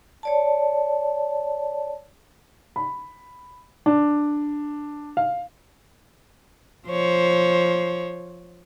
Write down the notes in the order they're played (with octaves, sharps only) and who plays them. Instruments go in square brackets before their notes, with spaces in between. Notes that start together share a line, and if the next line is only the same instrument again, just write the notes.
[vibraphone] C#5 D5 A5
[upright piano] B5
D4
F5
[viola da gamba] F3 C5 C#5